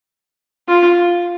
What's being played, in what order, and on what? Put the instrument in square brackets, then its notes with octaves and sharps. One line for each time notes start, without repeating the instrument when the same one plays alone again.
[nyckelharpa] F4